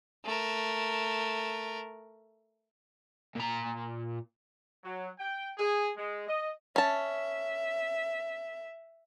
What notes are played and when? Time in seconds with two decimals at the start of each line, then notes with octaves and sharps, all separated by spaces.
0.25 A3 A#4
3.35 A#2 A#5
4.82 F#3
5.18 G5
5.58 G#4
5.97 G#3
6.28 D#5
6.76 C#4 E5 A5